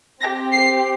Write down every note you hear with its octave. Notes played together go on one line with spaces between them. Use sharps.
C4 G4 A#6
C7